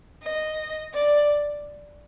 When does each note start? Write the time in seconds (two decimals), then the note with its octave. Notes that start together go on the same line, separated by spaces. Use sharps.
0.23 D#5
0.94 D5